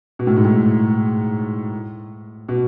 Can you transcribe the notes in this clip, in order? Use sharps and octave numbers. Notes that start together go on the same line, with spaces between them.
B2
A2
G#2
A2
B2